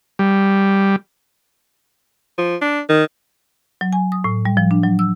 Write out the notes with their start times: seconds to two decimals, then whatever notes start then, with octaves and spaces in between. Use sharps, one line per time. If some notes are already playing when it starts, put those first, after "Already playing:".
0.19 G3
2.38 F3
2.61 D4
2.89 D#3
3.81 F#3
3.93 G#5
4.12 D#6
4.24 A2
4.45 G3
4.57 F3
4.71 D4
4.83 F#3
4.99 E6